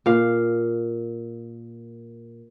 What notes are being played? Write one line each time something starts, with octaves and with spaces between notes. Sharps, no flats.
A#2 F5